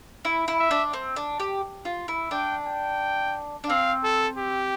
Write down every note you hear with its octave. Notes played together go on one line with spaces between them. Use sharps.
E4
E4
E5
D4
C4
D4
G4
F4
E4
D4 G5
G5
D4
C4 F5
A4
G4